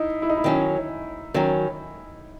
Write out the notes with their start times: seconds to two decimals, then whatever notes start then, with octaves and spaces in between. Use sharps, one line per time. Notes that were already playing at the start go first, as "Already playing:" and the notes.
Already playing: D#4 E4
0.22 E4
0.30 D#4
0.37 E4
0.44 D#3 F#3 C#4 D#4
1.34 D#3 F#3 C#4